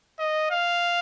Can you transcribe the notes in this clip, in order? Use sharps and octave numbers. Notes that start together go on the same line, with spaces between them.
D#5
F5